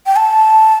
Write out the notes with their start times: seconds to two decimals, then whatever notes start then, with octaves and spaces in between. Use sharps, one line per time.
0.06 G5
0.16 A5